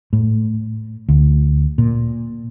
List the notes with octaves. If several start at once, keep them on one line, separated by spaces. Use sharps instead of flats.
A2
D2
A#2